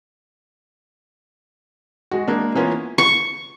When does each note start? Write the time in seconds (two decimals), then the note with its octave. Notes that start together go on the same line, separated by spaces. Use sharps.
2.11 G#3 F#4
2.27 G#3 A#3 D4
2.55 E3 A#3 B3 C#4 F4
2.98 C#6